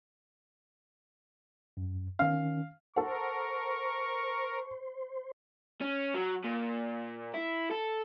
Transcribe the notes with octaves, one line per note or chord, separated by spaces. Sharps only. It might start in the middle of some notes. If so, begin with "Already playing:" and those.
F#2
D#3 C#4 F5
A4 A#4 C5 F#5 C#6
C#4
F#3
A#2
E4
A4